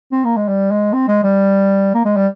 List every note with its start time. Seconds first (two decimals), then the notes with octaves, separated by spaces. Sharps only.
0.12 C4
0.24 A#3
0.36 G#3
0.48 G3
0.71 G#3
0.93 C4
1.08 G#3
1.23 G3
1.94 A#3
2.05 G#3
2.16 G3